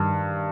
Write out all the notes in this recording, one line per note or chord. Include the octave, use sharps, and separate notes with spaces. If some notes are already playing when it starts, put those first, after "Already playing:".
Already playing: G2 D#3